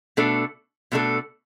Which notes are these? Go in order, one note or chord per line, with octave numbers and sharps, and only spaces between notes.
B2 A3 D4 A4
B2 A3 D4 A4